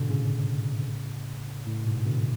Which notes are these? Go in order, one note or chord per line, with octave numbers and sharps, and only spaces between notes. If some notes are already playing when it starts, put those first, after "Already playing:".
Already playing: G#2 B2 D3
A2 C#3
A2
G#2 B2
B2 D3